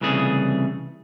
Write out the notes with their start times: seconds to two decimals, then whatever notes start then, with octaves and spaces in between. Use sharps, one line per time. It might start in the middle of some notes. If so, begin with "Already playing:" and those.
0.01 C2 C#3 E3 A3 G#4